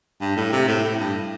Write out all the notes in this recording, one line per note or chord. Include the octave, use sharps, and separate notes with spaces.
G2
A2
C3
A2
A2
G2